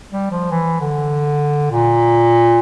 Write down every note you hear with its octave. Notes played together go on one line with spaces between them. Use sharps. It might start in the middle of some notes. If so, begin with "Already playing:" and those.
G3
F3
E3
D3
A#2